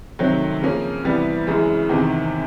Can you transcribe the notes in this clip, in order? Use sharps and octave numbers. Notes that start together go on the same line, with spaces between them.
C3 D#3 F#3 A3 C4
C#3 F3 A#3 C#4
C3 E3 G3 B3
F#2 C#3 E3 G#3
E2 C3 D#3